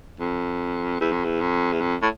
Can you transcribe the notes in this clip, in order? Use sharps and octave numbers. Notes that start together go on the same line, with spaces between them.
F2
E2
F2
E2
F2
E2
F2
A2